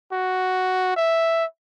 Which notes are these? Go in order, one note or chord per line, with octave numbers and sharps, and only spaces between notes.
F#4
E5